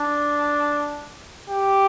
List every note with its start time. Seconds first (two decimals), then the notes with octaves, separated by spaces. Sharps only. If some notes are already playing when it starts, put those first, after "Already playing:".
Already playing: D4
1.50 G4